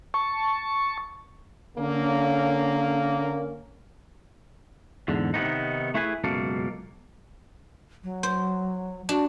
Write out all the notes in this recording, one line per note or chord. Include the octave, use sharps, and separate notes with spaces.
A5 C#6
D3 A#3 C#4
E2 G#2 D3
C3 D#3 E3 B3 C4 D#4
A3 E4 G#4 B4 G#5
C#2 F#2 B2 A#3 A4
F#3
C5
D4 F#4